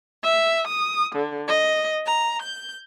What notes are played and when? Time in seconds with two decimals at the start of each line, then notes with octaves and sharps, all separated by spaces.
0.23 E5
0.67 D#6
1.15 D3
1.48 D#5
2.06 A#5
2.43 G6